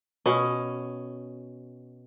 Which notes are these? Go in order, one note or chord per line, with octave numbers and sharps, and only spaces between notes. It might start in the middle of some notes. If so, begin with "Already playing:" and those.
B2 C#4